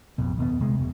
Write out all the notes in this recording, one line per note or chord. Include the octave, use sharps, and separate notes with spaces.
A1 F2 B2
D#2 B2 B3
D#1 C3 G#3
E1 B2